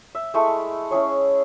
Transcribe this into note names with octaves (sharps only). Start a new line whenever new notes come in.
E5
G#3 A3 E4 C#6
C#4 E4 G#4 C#5